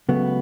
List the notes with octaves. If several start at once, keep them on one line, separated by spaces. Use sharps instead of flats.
C#2 C#3 F#3 A3 B3